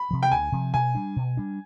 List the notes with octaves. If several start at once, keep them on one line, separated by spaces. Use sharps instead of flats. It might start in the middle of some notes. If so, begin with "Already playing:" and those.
Already playing: B5
C3 F3
G5
D2 G#5
C3 F3
B2 G#5
G3 D4
B2
G3 D4